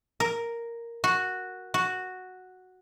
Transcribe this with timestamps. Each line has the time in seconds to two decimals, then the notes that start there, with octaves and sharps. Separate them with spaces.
0.20 A#4
1.04 F#4
1.74 F#4